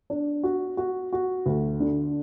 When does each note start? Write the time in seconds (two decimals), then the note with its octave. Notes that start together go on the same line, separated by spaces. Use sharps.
0.10 D4
0.43 F#4
0.77 F#4
1.13 F#4
1.46 D2
1.80 D3